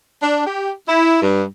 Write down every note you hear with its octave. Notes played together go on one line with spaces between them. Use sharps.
D4
G4
E4
G2